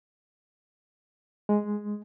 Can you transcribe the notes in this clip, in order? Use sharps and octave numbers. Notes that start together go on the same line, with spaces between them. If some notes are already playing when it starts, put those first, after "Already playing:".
G#3